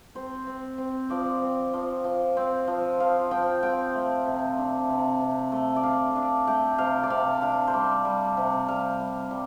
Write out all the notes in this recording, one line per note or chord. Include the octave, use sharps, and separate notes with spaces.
C4 C5
C4
C4
F3 D5
C4
F3
F3
C4
F3
F3 F5
F3 G5
C4 G5
A3
C3
D4
C3
C3
A3
D5
D4 F5
D4
A3 G5
C3 F5
D5
C3 F5
D4 F5
C5
G3 D5
G3
C3
G3 F5
G3
G3